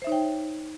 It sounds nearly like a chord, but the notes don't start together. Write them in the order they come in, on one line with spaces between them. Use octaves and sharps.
C5 E5 D#4 C#5 G5